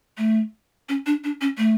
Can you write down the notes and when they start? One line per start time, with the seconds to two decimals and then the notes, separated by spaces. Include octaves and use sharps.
0.18 A3
0.89 C#4
1.06 D4
1.24 D4
1.41 C#4
1.58 A3